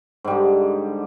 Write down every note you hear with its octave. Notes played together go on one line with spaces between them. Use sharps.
G#2 D3 G3